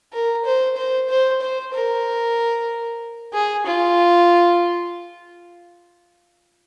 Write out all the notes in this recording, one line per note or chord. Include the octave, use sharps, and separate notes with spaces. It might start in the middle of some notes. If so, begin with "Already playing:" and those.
A#4
C5
C5
C5
C5
A#4
G#4
F4